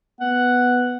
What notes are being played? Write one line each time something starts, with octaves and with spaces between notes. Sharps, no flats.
B3 F#5